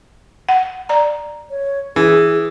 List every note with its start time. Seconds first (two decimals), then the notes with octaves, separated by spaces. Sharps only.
0.49 F#5
0.89 D5 A#5
1.51 C#5
1.96 E3 G#4